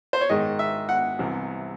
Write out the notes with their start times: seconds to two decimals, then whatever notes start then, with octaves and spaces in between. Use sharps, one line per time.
0.13 C5
0.21 C#5
0.29 G#2 D#3 G#3 D#5
0.59 E5
0.89 F#5
1.19 C2 C3 E3